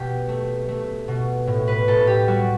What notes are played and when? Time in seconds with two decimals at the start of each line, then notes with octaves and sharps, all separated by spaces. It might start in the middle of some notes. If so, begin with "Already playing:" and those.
Already playing: B2 G4
0.28 A3
0.69 A3
1.08 B2
1.47 A2
1.68 B4
1.88 A2 A4
2.07 G4
2.27 G3 F#4